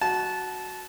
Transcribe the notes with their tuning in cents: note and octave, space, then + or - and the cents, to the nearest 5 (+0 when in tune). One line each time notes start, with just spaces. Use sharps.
F#4 +0 A5 -20